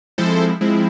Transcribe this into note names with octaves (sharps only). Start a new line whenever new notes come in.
F3 G#3 C4 E4 A4 C5
F3 G#3 C4 E4